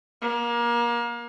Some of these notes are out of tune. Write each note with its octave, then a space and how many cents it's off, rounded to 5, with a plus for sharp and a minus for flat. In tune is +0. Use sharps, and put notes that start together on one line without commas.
A#3 +30